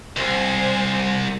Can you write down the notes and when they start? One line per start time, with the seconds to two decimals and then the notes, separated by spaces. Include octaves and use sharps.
0.17 C2 C5 G#5